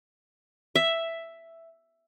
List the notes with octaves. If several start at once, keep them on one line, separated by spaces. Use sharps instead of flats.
E5